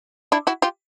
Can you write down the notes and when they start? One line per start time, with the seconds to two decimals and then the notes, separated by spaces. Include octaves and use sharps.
0.32 D4 E4
0.47 E4 F#4
0.62 F4 G4